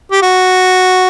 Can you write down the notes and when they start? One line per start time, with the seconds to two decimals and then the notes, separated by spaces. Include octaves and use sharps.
0.11 G4
0.22 F#4